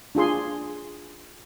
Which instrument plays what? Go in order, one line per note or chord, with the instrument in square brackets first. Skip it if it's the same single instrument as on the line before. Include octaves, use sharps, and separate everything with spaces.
[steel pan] D4 F4 G#4 C6